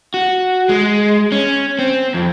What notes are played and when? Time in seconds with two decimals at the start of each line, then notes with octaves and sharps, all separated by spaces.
0.14 F#4
0.69 G#3
1.32 C#4
1.79 C4
2.14 F2